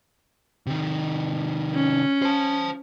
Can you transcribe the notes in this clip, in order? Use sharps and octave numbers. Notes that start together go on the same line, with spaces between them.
C3 D#3
C#4
C5 A5